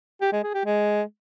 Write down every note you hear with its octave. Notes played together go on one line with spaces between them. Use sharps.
G4
G#3
G#4
G4
G#3